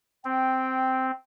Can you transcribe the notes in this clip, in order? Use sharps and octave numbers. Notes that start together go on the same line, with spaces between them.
C4 G5